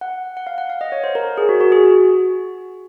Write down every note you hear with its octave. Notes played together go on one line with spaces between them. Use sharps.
F#5
F#5
F5
F#5
F5
D#5
C#5
C5
A#4
G#4
F#4
F#4
G#4
F#4